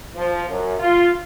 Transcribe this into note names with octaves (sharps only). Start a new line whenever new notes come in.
F3
F#2
F4